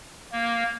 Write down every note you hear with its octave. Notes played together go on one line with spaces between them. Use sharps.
A#3